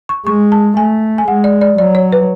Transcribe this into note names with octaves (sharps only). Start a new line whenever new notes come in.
C#6
G#3 C#6
A5
A3 G#5
G#5
G#3 F#5
D5
D5
F#3 D5
C#5
B4